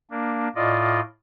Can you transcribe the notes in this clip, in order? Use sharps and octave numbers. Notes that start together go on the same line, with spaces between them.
A#3 D4
A2 F4 D5 D#5